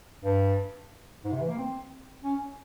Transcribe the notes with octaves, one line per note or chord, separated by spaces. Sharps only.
G2
G#2
C3
E3
A#3
C4
C#4